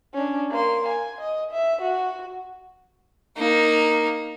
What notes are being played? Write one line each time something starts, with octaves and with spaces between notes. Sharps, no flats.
C#4 D4
A#3 C6
G#5
D#5
E5
F#4
A#3 D#4